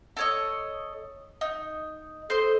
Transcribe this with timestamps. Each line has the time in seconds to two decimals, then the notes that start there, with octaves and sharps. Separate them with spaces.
0.17 A4 C#5 D#5
1.41 D#4
2.30 A4 C5 D#5